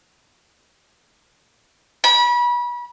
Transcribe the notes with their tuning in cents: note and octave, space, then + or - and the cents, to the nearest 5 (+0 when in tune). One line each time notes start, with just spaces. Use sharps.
B5 -30